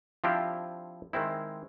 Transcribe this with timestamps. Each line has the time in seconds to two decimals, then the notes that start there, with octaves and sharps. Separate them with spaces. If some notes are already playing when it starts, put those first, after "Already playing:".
0.24 F3 C4 D4 E4 F4 G4
1.13 D#3 G#3 C4 E4